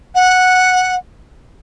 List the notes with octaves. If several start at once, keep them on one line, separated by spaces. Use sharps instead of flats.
F#5